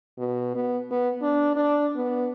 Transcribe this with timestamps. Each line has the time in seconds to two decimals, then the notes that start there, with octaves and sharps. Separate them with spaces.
0.18 B2
0.55 B3
0.91 B3
1.22 D4
1.56 D4
1.96 B3